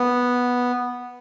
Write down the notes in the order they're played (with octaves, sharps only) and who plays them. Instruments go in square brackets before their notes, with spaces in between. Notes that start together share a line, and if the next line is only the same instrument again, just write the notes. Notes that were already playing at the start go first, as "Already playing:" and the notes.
Already playing: [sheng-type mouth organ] B3